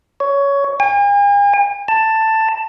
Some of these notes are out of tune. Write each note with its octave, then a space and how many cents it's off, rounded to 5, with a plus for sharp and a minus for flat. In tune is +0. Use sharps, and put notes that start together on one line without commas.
C#5 +15
G#5 -45
A5 +10